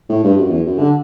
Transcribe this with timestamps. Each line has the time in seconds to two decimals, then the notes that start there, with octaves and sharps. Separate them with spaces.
0.09 A2
0.23 G2
0.37 F#2
0.50 E2
0.66 F#2
0.79 D3